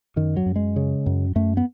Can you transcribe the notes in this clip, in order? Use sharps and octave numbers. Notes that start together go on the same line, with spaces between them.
F#2 D#3
F#3
F#2
G#3
C#3
F#2
F#2 A3
B3